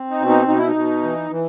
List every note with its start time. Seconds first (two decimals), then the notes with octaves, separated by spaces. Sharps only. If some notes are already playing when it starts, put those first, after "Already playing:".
Already playing: C4
0.10 D#4
0.20 B2
0.29 D#4
0.48 B2 D#4
0.58 E4
0.68 D#4
0.76 B2
1.03 E3
1.31 E3